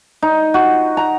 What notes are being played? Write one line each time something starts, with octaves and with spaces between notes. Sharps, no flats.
D#4
F#4
A#5